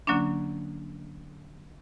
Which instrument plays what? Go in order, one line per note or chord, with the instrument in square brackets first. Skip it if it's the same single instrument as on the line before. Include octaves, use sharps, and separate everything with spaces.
[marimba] D3 F#3 A#3 C#4 D4